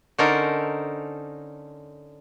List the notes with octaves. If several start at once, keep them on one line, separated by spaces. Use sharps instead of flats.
D3 C#4 D#4 A4 A#4 C5